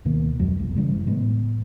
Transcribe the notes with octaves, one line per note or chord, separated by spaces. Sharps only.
D2 B2 D#3 A#3
F1 F2 F#3 G#3
F1 B1
C#3 E3 G3 G#3
F#1
A2 G#3 B3